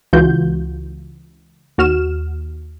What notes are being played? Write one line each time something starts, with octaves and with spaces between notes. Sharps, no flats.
C#2 E3 F4 F#4 G6
D#2 F#4 F6 E7